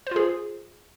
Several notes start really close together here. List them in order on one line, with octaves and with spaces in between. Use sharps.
C5 F4 G#4